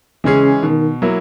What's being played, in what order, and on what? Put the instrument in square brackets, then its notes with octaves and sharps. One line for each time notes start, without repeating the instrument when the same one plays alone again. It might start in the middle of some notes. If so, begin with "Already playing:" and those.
[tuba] C#3 [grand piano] E3 G#3 C#4 G#4
[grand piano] B2 [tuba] D#3
[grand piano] F#3 A#3 E4